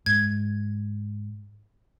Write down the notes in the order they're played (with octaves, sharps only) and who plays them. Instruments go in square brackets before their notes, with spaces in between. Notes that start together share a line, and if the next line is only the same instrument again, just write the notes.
[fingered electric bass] G#2 [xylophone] G#6